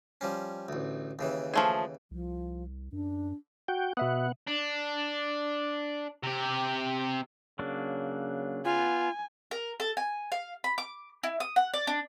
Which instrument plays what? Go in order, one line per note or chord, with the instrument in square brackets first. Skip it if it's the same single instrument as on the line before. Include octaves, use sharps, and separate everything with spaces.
[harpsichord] F3 G3 C#4
A1 D2
D#2 C#3 E3
[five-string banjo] F3 A3 G#4
[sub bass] C2 [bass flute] F3
[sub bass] F#2 [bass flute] D4
[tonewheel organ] F#4 G5
[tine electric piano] B2 E5 D#6 [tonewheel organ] B3 F#5
[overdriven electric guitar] D4
C3 G4
[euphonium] C#3 [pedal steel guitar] F#3 A#3 D4
[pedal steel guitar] B3 [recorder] F4 [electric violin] G#5
[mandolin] A#4
A4
G#5
F5
B5
D6
E4
D#6
F#5
D5
D4